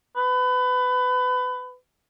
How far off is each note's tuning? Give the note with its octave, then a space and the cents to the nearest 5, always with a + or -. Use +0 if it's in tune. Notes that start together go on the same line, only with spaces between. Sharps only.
B4 +25